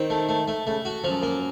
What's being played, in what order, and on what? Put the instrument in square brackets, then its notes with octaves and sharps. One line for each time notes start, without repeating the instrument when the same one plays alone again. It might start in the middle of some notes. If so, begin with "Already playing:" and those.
Already playing: [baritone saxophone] D#3 [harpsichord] C4
[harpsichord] A3
A3
A3
[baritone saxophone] C#3 [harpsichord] A3
[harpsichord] F#4
[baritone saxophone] F#2 [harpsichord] F3
[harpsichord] A#3